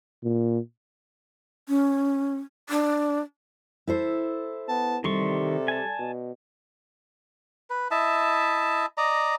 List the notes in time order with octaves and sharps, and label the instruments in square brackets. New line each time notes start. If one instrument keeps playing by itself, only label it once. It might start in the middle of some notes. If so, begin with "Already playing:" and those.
[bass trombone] A#2
[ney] C#4
[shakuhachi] D4
[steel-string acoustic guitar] E4 A4 C5
[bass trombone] B3 [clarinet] A5
[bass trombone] C3 [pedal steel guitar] D#3 C6 C#6 [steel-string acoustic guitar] G3 [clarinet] A4
[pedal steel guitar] G#5 A5
[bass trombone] B2
[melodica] B4
E4 D#5 E5 A5
D5 D#5 A#5